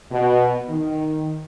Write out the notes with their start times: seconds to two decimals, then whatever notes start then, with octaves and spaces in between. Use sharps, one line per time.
0.12 B2
0.68 D#3